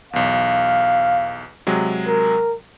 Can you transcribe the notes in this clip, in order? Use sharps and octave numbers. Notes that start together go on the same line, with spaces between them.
B1 E2 F5
C3 F#3 G#3
A#4